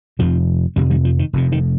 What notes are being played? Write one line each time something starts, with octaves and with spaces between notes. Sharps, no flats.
F1 F2 C3 F3
F1 F2 C3 D#3 G3
D#3 G3
F3
D#3
F1 F2 C3
D#3